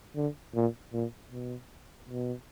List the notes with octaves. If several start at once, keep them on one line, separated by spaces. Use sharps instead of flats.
D3
A#2
A#2
B2
B2